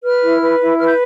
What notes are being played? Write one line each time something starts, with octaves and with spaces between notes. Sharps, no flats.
B4 F6
E4
B4
E4
B4 F6
G6